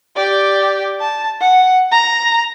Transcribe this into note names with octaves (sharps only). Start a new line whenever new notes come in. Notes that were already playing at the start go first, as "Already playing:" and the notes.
G4 D5
A5
F#5
A#5